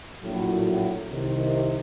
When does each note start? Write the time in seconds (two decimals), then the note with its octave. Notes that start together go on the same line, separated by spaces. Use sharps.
0.22 A#1 A2 F#3
1.10 C2 C3 D#3